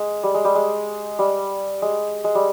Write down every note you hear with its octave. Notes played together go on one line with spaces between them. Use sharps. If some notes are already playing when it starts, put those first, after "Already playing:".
Already playing: G#3
G3
G#3
G3
G#3
G3
G#3
G#3
G3